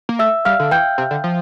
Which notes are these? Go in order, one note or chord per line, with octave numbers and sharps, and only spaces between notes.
A#3
A3 E5 E6
G3 F5 F6
D3
E3 G5 G6
C3
D3
F3